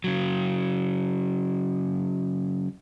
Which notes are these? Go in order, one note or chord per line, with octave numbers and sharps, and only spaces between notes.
C#3 F#3